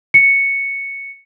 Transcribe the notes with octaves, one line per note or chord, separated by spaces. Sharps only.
C#7